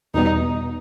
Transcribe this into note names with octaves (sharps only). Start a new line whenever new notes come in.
E2 B2 G3 B3 D#4